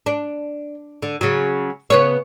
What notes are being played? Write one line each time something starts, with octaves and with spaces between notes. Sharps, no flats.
D4
D3
C#3 F#3
C#3 B3 C#5